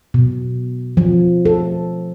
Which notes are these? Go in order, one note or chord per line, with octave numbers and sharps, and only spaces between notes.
B2
F3
A4